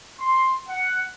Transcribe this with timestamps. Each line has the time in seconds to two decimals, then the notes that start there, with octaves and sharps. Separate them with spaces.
0.19 C6
0.68 F#5